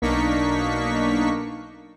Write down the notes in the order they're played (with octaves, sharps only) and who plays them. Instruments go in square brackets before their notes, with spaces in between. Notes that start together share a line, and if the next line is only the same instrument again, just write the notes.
[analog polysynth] B1 A#3 D4 D#4 C#6 B6